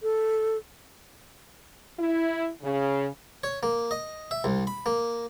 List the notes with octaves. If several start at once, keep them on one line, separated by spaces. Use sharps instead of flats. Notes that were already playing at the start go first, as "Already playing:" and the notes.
A4
E4
C#3
C#5
A#3
D#5
E5
C2
B5
A#3